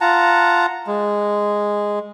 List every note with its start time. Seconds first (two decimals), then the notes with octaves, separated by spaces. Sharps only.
0.01 F4 F#5 A5 A#5
0.87 G#3